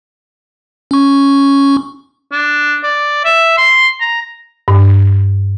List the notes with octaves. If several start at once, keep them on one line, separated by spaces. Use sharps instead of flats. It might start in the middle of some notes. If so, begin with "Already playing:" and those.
C#4 C#6
D4
D5
E5
C6
A#5
G2